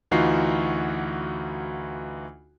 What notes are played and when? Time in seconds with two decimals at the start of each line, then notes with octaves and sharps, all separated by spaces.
0.11 D2 E3 D#4 F4 F#4 C7